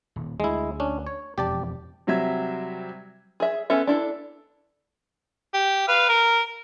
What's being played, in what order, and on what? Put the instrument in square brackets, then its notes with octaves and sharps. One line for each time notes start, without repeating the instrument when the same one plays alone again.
[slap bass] D#1
[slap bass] D2 [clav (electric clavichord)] G#3 E4
[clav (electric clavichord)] C#4 D4
C#5
[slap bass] E1 F2 F3 [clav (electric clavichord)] G4 D5 A5
[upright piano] C3 F#3 G3 E5 G#6
[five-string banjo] G#4 E5
B3 C#4 A4 E5
D4 E4 A4
[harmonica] G4
B4 F5
A#4